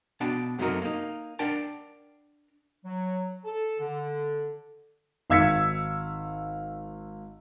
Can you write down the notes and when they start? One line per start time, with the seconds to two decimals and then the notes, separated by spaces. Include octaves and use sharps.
0.20 B2 D4 G5 A5 B5
0.59 F#2 C3 F#3 A3 D#4 A#4
0.82 A#3 D#4
1.39 D4 A#4 F#5 G5 A5
2.84 F#3
3.45 A4
3.79 D3
5.30 G#1 F5 E6 G#6 B6 C#7